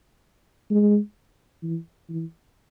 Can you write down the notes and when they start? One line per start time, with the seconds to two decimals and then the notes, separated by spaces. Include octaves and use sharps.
0.71 G#3
1.63 E3
2.09 E3